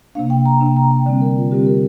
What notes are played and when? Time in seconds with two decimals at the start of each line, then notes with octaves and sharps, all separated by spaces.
0.15 C3 A#3 D4 F5
0.30 G5
0.45 A#5
0.61 C3 A#3 D4 G5
0.76 A#5
0.91 G5
1.06 D3 G3 C4 D5
1.21 A#4
1.37 F4
1.51 D3 G3 C4 G4
1.66 A#4